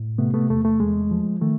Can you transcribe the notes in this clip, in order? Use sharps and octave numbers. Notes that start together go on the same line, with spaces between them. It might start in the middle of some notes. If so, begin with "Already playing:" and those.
Already playing: A2
C3 A3 B3
A3 B3
E2 A3
A3
E2 G#3
F3
D#3 A3